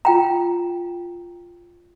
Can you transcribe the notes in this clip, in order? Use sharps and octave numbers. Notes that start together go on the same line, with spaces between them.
F4 G5 A#5